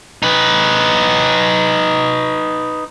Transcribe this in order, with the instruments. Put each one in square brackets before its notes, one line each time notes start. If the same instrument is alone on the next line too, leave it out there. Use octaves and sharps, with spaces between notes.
[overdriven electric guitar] D#4 B4